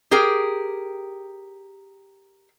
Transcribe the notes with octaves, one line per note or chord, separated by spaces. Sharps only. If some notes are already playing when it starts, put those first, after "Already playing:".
G4 G#4 A#4 G5